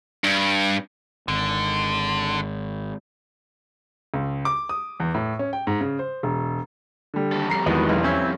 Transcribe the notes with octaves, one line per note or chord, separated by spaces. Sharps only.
G2
G#1 D3
C#2
D6
D#6
E2
A2
C#4
G5
G#2
C#3
C5
E1
D3 G3
D#2 A4
F2 G3 A#5 C7
E2 D#3 G#3 B3 F#4
B1
C4 C#4 E4